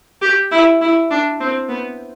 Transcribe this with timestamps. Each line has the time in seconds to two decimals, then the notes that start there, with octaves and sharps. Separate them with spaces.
0.22 G4
0.51 E4
0.81 E4
1.11 D4
1.40 C4
1.69 B3